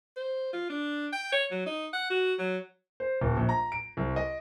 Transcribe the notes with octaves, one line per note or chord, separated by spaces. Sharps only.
C5
F4
D4
G5
C#5
F#3
D#4
F#5
F#4
F#3
C5
D#1
A#1
A#5
D7
C2
D#5